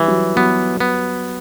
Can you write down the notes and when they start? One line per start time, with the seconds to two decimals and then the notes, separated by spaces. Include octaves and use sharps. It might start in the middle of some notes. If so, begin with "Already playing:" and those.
Already playing: E3 G3
0.08 F#3
0.36 F#3 B3
0.80 B3